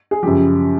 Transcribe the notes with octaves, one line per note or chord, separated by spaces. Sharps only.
G#4
F#2 C#3 F3 G4